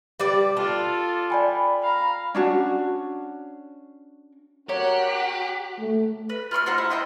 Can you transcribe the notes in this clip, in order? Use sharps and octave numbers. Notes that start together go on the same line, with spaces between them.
G3 B4 D5
D4 F4 A4
D5 G5 G#5 B5
F5 A#5
C#4 D4 F#4
F#4 G4 A#4 C#5 F#6
A3
B4
F4 B5 C6 F6
D#4 C5 F#5 C6
E4
C5 D#5 G5 C6